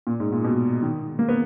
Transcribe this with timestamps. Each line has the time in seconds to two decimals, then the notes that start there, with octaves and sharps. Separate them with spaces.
0.07 A#2
0.20 G#2
0.32 A#2
0.44 B2
0.82 D#3
1.19 A#3
1.29 B3